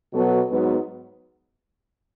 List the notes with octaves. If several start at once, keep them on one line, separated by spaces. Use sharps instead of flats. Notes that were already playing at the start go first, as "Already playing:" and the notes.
B2 F#3 B3 F#4 A4
G#2 F#3 B3